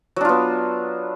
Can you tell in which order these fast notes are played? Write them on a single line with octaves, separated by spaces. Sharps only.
F#3 D4 F4 B3